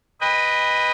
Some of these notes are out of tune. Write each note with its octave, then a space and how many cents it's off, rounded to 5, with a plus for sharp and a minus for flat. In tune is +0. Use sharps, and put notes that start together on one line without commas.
B4 +0 D#5 +0 G5 +30